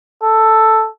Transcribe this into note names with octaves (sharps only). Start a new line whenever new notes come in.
A4